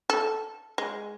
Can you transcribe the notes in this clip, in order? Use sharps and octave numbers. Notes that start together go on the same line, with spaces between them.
A4
G#3